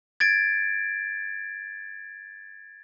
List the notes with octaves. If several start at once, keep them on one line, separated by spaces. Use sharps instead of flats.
G#6 A6 D7